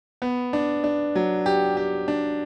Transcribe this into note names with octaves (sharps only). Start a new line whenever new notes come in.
B3
D4
D4
F#3
G4
G4
D4